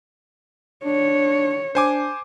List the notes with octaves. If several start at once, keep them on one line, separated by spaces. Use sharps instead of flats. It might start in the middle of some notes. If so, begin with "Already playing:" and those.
D4 C#5
D4 C5 G#5 D6